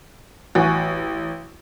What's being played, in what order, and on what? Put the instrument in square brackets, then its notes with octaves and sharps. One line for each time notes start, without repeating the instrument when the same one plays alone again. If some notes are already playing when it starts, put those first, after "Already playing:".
[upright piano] A1 [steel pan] F#4 G#5